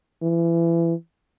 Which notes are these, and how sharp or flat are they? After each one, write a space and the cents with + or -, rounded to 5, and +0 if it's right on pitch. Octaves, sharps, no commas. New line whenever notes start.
E3 +30